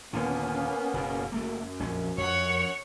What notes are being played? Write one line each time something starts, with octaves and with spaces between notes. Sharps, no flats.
D#2 A#2 D3 A#3 B3 C#4
F#1 B2
F#1 F#2 A3 A#3
A#1 F2 C#4
F2 C#5 F#5